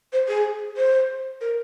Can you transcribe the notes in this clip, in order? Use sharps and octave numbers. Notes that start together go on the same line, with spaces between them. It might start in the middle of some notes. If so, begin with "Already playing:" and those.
C5
G#4
C5
A#4